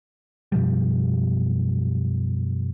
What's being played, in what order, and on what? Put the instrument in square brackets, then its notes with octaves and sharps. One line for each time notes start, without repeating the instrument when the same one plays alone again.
[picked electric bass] F#2 B2 F3 G3